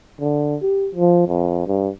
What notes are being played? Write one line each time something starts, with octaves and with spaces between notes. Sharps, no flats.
D3
G4
F3
F2
G2